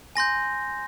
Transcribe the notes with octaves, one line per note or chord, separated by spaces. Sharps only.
G#5 C6 G6 A#6